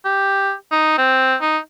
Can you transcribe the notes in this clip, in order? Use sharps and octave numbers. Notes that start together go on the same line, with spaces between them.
G4
D#4
C4
D#4